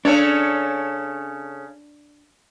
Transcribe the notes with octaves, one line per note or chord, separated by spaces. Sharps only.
C#3 D4 A4 C#5